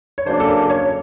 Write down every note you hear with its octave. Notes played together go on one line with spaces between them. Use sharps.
C#5
C#3 F#3 A#3 D4 C5
A4
A#4
C#5